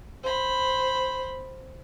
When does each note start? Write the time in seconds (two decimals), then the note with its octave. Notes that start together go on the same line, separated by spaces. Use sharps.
0.23 C5 B5